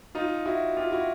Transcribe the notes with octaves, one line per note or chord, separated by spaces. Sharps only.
D#4 F4
E4 F#4
F4 G4
E4 F#4